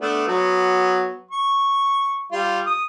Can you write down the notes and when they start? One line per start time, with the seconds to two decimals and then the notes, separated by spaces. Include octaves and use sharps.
0.01 A3 B3 D4
0.27 F#3 B3
1.31 C#6
2.32 G3 F4
2.66 D#6